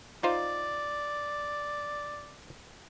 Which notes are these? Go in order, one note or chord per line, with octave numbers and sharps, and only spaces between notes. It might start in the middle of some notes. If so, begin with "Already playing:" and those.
D#4 F4 C5 D5